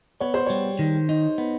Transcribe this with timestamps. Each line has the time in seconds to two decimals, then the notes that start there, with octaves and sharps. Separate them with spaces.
0.20 B3 C#5
0.34 C5
0.46 G3 C#5
0.79 D#3
1.09 D#4
1.38 B3